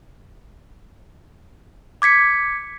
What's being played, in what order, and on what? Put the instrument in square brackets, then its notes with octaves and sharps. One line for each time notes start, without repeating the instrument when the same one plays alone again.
[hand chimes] D6 G#6 B6 C#7